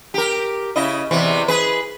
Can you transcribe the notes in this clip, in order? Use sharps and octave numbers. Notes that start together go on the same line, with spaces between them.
G4 A#4
C#3 E4 D#5
E2 C3 E3
G#4 B4